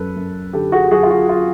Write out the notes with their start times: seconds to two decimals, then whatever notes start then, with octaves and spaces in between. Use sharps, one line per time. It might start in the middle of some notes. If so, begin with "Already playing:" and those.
Already playing: F#2 F#3 A4 B4
0.16 F#2
0.53 D3 G4 A4
0.72 F#4 G#4
0.91 F#3 F#4 G#4
1.03 F4
1.10 F#4
1.29 F4